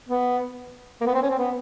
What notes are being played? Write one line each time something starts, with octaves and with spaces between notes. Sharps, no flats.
B3
A#3
B3
C4
C#4
C4
B3